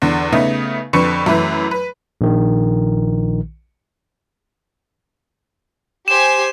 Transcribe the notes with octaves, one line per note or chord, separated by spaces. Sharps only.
E2 D3
C#3 A3 B3 D#4
F2 D3 B4 C#6 C#7
F#2 E3 A3 B4
B4
A#1 D#3
G4 C5 G#5 E7